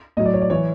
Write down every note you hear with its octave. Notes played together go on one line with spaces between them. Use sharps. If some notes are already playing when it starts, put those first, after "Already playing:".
A2 F#3 D#5
D5
C#5
D5
E3 C#5